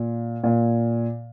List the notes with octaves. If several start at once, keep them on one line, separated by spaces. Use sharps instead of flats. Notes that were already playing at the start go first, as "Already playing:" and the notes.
Already playing: A#2
A#2